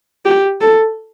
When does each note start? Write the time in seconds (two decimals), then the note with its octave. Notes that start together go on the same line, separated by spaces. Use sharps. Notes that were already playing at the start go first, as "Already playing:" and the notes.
0.25 G4
0.61 A4